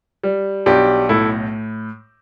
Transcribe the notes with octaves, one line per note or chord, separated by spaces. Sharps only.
G3
B1 D4 G4
A2 E4 A4